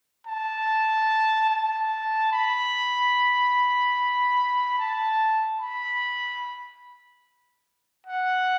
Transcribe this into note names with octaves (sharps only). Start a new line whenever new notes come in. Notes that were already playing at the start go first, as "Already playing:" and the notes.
A5
A5
B5
A5
B5
F#5